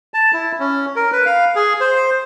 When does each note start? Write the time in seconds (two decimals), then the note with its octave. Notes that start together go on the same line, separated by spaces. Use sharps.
0.14 A5
0.33 E4
0.60 C#4
0.96 A#4
1.12 B4
1.26 F5
1.55 G#4
1.81 C5